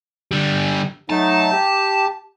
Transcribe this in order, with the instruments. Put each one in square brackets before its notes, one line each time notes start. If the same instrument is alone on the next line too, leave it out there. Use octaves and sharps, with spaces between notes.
[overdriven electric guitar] D3 G3
[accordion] F#3 A3 D#4 [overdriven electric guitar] A5
[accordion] G4